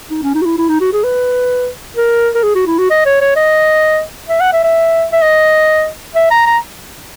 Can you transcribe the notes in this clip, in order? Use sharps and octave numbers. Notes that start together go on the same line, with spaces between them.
D#4
C#4
D#4
F#4
E4
E4
D#4
F#4
G#4
B4
A#4
A#4
G#4
F#4
E4
F#4
D#5
C#5
C#5
D#5
E5
F#5
E5
E5
E5
D#5
E5
A#5
A#5